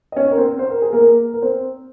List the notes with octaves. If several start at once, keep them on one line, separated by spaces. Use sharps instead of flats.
D#5
C#4 C#5
A#4
C4 C5
C5
A#4
G#4
A#3 A#4
A#4
C4 C5